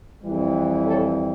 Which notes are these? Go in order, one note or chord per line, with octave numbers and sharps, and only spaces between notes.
F2 E3 G3
A4 C#5